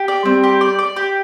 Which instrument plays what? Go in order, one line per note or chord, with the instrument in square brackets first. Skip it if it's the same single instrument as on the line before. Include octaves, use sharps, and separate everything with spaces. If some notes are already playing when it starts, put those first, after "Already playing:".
Already playing: [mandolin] G4
D5
[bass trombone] G3 [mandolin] C4
[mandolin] G4
D5
D5
G4